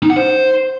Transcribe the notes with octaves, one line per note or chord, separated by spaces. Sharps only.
D#4
F#5
C5